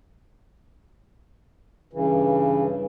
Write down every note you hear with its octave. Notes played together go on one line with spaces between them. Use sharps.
G2 C#3 E3